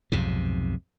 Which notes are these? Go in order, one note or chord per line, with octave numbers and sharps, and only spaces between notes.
B1 F2 G#2 C3